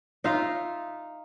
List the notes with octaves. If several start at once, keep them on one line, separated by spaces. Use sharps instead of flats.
D#4 F4 E5 F5